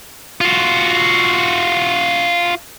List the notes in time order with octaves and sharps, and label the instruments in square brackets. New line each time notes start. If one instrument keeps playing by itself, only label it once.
[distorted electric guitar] F4 F#4